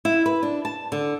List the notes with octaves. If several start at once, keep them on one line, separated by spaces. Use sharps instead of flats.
E4
B4
D4
A5
D3